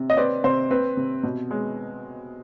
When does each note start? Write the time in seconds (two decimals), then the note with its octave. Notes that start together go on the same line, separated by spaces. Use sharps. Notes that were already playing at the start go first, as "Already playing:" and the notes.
Already playing: C3
0.10 D#5
0.17 C4 B4 D5
0.44 C3 C5
0.71 C4 B4
0.97 C3
1.23 B2
1.51 G#3